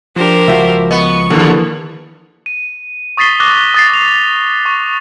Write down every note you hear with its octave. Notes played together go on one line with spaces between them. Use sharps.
F3 D4 G4 A#4 C5
C#2 F3 F#4 E5
B3 D#5 C#6
D#2 D3 E3 F3 A#3
D#7
C#6 D#6 A6 B6 C7 G7
D6 D#6 F#6 A#6 G7
D#6 A6 C7
D#6 F7
C#6